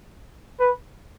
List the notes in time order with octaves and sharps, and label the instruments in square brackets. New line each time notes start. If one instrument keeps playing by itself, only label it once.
[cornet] B4